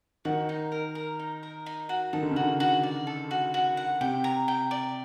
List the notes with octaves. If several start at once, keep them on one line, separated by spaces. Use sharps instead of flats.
D#3 F#4
D#4
A#4
A#4
D#4
A#4
D#4
F#4
D#3 A4
D3
C#3
D3 F#4
F#4
D5
A4
F#4
F#4
F#5
C3 G5
A#5
G5
D5